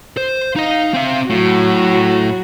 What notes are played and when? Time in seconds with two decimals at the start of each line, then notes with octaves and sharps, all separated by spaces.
0.17 C5
0.56 D#4 D#5 F5
0.94 C4 E5
1.30 A2 F#3 F#4